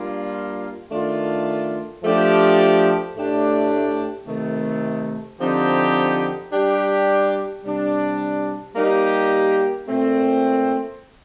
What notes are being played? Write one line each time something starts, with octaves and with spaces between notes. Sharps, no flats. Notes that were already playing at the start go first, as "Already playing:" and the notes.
Already playing: G3 A#3 D4 F4
D#3 A3 D4 F4
F3 A3 D4 G4
A2 A3 D4 G4
C3 D#3 A3
D3 F3 C4 D#4 G4
G3 D4 G4
C3 G3 D4
G3 A#3 D#4 G4
A#2 A3 C4